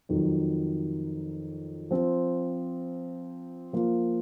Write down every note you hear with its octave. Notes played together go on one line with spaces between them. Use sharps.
F2 D#3 F#3
F3 C4 F4
F3 A#3 F4